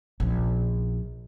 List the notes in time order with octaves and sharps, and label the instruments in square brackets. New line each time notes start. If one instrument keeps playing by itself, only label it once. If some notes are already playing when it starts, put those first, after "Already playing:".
[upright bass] A#1 C#4